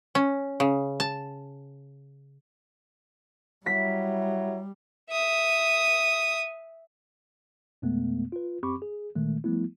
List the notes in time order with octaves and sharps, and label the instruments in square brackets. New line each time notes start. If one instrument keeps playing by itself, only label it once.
[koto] C#4
C#3
A5
[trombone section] F#3 E4 [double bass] G3 [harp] B6
[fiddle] E5 D#6
[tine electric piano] F2 B2 G#3 A3 B3
F4 B4
F#2 C4 G4 B5 C#6 D6
G#4
A#2 D#3 G#3 A3
F3 G3 A3 B3 E4